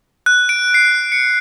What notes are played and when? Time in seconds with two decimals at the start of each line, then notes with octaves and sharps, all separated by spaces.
0.26 F#6
0.49 D7
0.74 C7
1.12 C#7